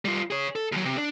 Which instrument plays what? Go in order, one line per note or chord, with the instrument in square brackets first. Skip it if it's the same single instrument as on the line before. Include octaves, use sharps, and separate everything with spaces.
[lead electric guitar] G3 F4
G#4 C#5
A4
D#2 F#3
C3
D4